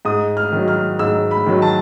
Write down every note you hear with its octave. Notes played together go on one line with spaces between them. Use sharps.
G#2 D#6
F6
D#3 F#3
F6
G#2 E6
B5
D#3 F#3
A5